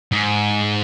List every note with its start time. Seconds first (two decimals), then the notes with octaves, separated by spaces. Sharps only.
0.12 G#2